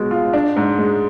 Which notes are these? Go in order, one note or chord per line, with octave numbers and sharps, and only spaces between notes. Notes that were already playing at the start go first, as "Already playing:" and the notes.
Already playing: B2 G#3
F4
D4
G#2
G#3